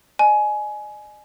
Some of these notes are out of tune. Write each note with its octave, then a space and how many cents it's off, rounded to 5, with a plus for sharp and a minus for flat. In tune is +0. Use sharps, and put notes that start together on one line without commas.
D#5 -45 G#5 +20